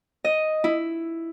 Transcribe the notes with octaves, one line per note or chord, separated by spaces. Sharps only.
D#5
E4